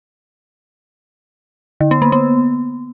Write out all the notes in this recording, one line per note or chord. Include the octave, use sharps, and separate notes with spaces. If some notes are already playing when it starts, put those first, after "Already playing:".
D3
B3
A#3
B3